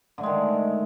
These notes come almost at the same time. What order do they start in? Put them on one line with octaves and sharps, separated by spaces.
D3 A3 G#3 D#3